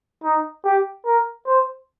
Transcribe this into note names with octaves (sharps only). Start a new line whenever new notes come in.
D#4
G4
A#4
C5